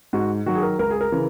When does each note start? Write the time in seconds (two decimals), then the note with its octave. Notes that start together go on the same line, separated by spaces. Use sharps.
0.13 G#2 F#4
0.46 D#3 F#3 F#4
0.55 G#4
0.63 A#4
0.79 C#2 A#4
0.91 G#4
1.01 A#4
1.12 C#3 E3